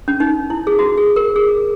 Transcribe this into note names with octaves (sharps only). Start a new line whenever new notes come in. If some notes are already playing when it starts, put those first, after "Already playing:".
C#4
D#4
E4
G#4
F#4
G#4
A#4
G#4